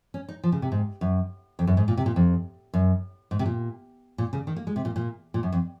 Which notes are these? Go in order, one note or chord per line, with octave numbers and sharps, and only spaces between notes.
C#4
D#4
F3
C#3
C3
G#2
F#2
F2
F#2
G#2
A#2
C3
A#2
F2
F#2
G#2
C3
A#2
A#2
C#3
D#3
A#3
G#3
C3
A#2
A#2
A#2
F#2
F2